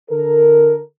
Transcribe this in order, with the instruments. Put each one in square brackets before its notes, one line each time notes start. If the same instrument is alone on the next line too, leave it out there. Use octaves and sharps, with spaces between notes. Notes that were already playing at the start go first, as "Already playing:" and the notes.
[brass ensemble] D3 A4 A#4